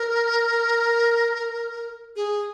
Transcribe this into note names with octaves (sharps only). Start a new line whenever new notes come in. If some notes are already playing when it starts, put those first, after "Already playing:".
Already playing: A#4
G#4